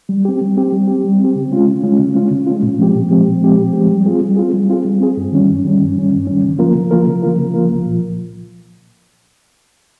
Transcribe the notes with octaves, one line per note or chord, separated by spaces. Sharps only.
G3
C4 G4
G3
C4 G4
G3
C4 G4
G3
C4
G4
C#3
G#3 C#4 F4
C#3
G#3 C#4 F4
C#3
G#3 C#4 F4
C#3
G#3 C#4 F4
A#2
F3 G#3 C4 G4
A#2
F3 G#3 C4 G4
A#2
F3 G#3 C4 G4
A#2
F3 G#3 C4 G4
G3
C4 F4 G#4
G3
C4 F4 G#4
G3
C4 F4 G#4
G3
C4 F4 G#4
G2
D#3 G3 C#4
G2
D#3 G3 C#4
G2
D#3 G3 C#4
G2
D#3 G3 C#4
C#3
F3 A#3 F4 A#4
C#3
F3 A#3 F4 A#4
C#3
F3 A#3 F4 A#4
C#3
F3 A#3 F4 A#4
C2
A#2 F3